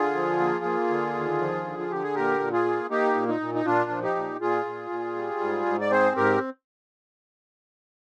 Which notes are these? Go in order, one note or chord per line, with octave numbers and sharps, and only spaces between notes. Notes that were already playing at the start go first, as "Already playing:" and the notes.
Already playing: D3 F4 G#4
F3
A#3
A#3
D3
D#2
F3
D3
F4
D3 G4
G#4
A#2 G4 A#4
A#2
F4 G#4
A#3
A#3 D#4 G4
A#2
D#4
A#2
D#4
A#2 D4 F4
F3
D#4 G4
A#2
A#2 F4 G#4
A#2
A#2
G3
G#2
G#2
D5
C4 G#4 C5
G#2 G4 A#4